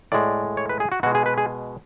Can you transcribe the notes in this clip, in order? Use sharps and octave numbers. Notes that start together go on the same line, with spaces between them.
A2 G#3 D5
C#5
B4
G#4
F#4
B2 G#3 F#4
G#4
B4
G#4